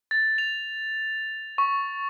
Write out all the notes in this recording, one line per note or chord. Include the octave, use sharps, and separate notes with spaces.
A6
F7
C#6